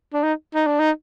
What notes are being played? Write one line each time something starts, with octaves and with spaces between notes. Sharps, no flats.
D4
D#4
D#4
D4
D#4